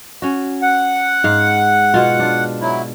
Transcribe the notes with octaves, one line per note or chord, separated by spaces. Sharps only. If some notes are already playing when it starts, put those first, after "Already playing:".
C#4 F#4
F#5
G#2 F5
B2 F4
D4 F4
F#3 E4